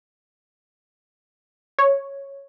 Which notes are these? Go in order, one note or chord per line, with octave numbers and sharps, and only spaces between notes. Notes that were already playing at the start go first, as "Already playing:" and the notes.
C#5